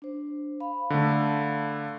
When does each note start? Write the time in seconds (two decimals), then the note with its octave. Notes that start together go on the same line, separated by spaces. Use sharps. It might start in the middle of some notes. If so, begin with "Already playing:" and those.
0.02 D4 C5
0.60 F5 B5
0.90 D3 A3